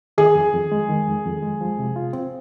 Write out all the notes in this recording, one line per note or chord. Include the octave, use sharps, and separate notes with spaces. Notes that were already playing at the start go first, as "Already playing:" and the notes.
D#3 G#4
F2
F2
G#3
D#3
F2
F2
G#3
F3
C3
F4
C4